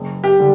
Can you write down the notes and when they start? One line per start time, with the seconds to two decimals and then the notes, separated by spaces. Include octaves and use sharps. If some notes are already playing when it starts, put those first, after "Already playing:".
Already playing: F#1
0.24 G4
0.39 D3 G3 D4